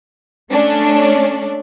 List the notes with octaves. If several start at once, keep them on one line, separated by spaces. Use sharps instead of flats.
A3 C#4 D4